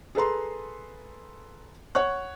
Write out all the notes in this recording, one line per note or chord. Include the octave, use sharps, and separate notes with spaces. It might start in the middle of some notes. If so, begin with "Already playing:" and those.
G#4 A4 B4 A#5 C6
C#5 F#5 C#6 F#6